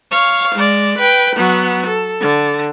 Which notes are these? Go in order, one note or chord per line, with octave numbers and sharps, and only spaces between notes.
C#5 F5
G#3 D5
B4 G5
F#3 B3
A4
D3